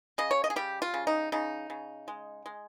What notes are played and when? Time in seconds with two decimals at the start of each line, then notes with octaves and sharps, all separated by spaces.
0.18 C#3 D#5
0.31 C#5
0.44 D#5
0.50 G#4
0.56 G3 G4
0.82 F4
0.94 C#3
1.07 D#4
1.32 C#3 D#4
1.70 C#3
2.08 G#3
2.46 G#3